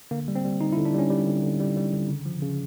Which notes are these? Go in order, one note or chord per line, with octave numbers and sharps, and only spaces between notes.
D3 A#3
G3
C4
G3
D3 D#4
E4
D3
D4
G3 C#4
G3
D3
D3
G3
G3
D3
C#3
F3
C#3